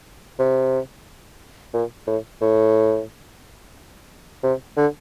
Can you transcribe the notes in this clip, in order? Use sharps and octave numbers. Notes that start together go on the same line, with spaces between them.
C3
A#2
A2
A2
C3
D3